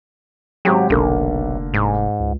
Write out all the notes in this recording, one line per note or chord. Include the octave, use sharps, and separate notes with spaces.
G#1 F#3 G4
F1 B1 D3 A#3
G#2
C#2